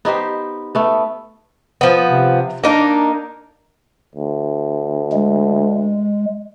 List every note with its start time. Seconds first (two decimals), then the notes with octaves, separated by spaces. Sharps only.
0.05 B3 D#4 G4 C5
0.75 A3 B3
1.81 F3 B3
2.08 C3
2.64 A#3 D4 D#4 A#4
4.15 D2
5.12 G#3